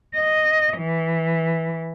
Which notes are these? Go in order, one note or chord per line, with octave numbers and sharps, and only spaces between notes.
D#5
E3